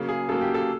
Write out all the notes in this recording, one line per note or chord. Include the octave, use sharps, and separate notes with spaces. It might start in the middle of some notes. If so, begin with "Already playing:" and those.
Already playing: C#3 F#3 A#3
G#4
C#3 F#3 A#3 A4
G4
A4